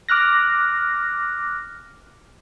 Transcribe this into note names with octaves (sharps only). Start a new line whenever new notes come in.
D6 F6 F#6 A#6